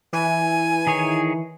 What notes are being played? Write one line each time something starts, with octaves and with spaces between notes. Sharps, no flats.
E3 G#5
D#3 G#4 C#5